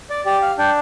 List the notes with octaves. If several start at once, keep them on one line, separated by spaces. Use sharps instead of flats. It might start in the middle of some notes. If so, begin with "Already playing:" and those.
D5
G4 D5
F5
D4 G5